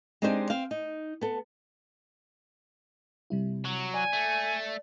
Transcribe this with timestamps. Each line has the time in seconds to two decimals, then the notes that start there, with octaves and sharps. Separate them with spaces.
0.22 G#3 C4 D4 D#4 G4 C5
0.50 C4 F5
0.71 D#4
1.21 B3 A4
3.30 C3 G3 E4
3.65 F#3
3.94 D5 G#5
4.13 A3